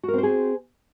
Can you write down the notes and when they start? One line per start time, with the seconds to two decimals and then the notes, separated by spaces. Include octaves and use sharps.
0.03 F#4
0.08 A#4
0.13 C4
0.18 C5
0.23 G#4